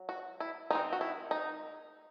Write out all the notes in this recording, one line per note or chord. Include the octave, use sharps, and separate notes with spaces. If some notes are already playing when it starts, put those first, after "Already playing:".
Already playing: F#3
F#4
E4
D#3 G#3 C4 D#4
F#4
E4
D#4